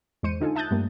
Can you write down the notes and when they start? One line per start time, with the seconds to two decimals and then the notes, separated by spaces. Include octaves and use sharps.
0.23 E2 G#2 G#3 C5 C#7 D#7
0.41 D3 D#4 F4 A4 G#5
0.56 E5 A5 D#6 F#6 G6 A6
0.71 G2 G3 A3 A#3